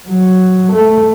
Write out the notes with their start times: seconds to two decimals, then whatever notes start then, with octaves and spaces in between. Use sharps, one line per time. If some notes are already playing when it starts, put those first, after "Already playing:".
0.08 F#3
0.72 A3